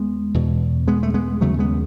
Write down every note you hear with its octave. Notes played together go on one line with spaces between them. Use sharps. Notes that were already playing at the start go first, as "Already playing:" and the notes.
Already playing: D#2 G#3 B3
E2 B2
G#3 B3
A3
G#3 B3
D#2 C#3 F#3 A3
G#3 B3